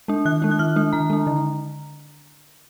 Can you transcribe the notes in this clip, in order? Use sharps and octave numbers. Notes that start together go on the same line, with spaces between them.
G#3 D4
D#3 F#6
G#3 D4
F#6
D#3 F6
G#3 D4
D#3 A#5
G#3 D4
D3